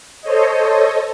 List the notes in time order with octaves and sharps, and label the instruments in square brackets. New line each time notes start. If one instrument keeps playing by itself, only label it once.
[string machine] A4 C5 C#5 D#5